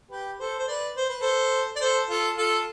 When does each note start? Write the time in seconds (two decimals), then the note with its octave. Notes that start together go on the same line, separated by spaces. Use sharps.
0.11 G4 B4
0.40 A4 C5
0.59 C5
0.68 B4 D5
0.96 C5
1.09 B4
1.21 A4 C5
1.76 D5
1.81 A4 C5
2.09 F4 A4
2.37 F4 A4